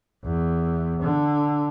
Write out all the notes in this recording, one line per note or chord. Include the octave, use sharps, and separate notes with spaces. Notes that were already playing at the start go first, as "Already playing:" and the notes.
E2
D3